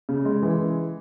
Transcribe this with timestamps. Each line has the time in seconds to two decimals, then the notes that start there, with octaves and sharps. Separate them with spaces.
0.09 C#3
0.25 G#3
0.42 E3